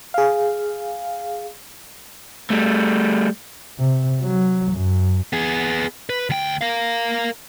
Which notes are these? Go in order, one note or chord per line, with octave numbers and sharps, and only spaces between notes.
G#4 F5
G3 A3
C3
F#3
F#2
B3 G#4
B4
D2 G5
A#4 F5